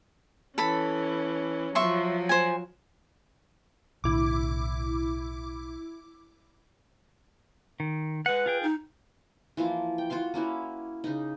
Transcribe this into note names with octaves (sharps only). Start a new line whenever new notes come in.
E3 C#4 A4 B5
F3 F#3 E5 C6 C#6
C5 G#5
B1 A2 D3 E4 D6
D#3
G#3 B4 F#5
F4 G#4 G5
D#4
E3 F3 A#3 F4
G5
F4 F#4 F5 C6
A#3 C#4 E4 F#4
C#3 D#4